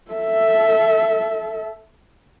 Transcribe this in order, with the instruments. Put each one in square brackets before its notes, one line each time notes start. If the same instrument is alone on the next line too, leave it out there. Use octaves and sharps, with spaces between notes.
[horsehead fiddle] A4 E5